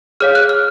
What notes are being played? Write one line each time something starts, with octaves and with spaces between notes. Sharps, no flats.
G#4 C#5 F5 F6
F#6
F6